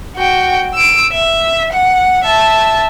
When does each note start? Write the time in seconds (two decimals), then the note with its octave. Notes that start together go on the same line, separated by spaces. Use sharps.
0.16 F#4 G5
0.74 E6 D7
1.12 E5
1.72 F#5
2.24 E5 A5